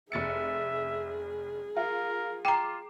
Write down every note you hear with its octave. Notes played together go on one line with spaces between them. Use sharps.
F1 G#4 E5 A6 C#7
F4 A#4
F4 G5 A#5 D6 C7 E7